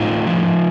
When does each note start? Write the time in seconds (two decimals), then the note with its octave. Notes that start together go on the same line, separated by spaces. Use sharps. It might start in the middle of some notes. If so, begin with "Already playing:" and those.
Already playing: A2 D#4 F4
0.27 F3